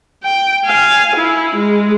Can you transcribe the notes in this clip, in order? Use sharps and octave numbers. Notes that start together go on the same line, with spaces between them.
G5
F5 G#5
E4
G#3